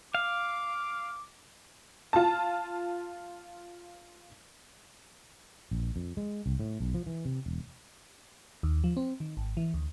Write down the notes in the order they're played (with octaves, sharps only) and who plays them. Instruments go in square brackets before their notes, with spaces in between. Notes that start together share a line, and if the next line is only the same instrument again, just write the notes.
[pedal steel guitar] F5 [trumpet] D6
[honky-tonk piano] F4 A5
[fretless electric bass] A#1
F2
G#3
C2
A2
B1
F3
E3
C3
E1
[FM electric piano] D#2
F3
C4
D#3
G#1
E3
D2